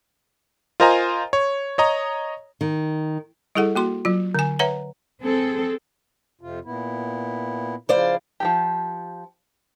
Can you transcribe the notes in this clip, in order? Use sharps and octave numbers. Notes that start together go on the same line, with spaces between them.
F4 A#4 C5 D#5 G#5 A#5
C#5
C#5 D#5 A#5
D#3
G3 E4 G#4 A4 F#5
A#3 F#4 C6
F#3 F4
D3 G#5
B4 C#5 E5 F#5 A#5
C4 G#4 A4
F2 C3 F4
A#2 B3 E4
C#3 F3 E4 C5 D5 F5
F3 F#3 G4